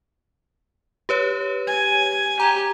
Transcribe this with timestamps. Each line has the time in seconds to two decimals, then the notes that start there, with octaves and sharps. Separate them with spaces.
1.09 G4 B4 C#5
1.67 G#5
2.40 G4 A#5